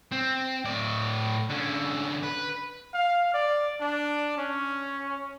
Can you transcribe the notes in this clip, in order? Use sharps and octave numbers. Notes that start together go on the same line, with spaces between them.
C4
A2 D5
D3 C#4
B4
F5
D5
D4
C#4